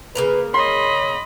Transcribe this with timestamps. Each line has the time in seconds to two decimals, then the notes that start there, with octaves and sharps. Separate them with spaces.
0.15 C#3 A#3 B4 A#5
0.54 C#5 D#5 B5 C6